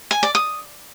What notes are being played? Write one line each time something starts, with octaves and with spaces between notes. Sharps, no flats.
G#5
D5
D#6